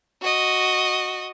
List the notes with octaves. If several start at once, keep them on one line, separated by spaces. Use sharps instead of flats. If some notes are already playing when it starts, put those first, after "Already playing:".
F#4 D#5